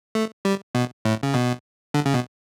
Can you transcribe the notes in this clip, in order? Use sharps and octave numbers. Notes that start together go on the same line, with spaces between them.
A3
G3
B2
A2
C#3
B2
D3
C#3
B2